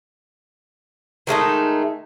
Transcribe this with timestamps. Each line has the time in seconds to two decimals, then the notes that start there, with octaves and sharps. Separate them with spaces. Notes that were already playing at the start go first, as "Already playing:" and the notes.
1.27 D#3 G#3 A3 D#4